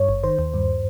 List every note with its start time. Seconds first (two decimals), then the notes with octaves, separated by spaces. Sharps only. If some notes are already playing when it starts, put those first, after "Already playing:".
Already playing: G2 C#5
0.09 G#1
0.24 D#3 C5
0.39 D#2
0.54 G2